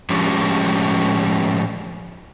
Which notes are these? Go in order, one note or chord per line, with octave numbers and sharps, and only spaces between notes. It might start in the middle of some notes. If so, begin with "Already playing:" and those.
A2 F3 G#3 C#4 D4 G4